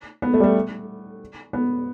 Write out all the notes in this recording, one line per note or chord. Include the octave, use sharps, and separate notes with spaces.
B3
A3
G3
A3
B3